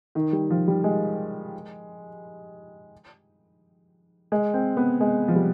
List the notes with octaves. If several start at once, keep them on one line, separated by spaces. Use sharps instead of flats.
D#3
G3
F3
G3
G#3
G#3
C4
B3
G#3
F3
G3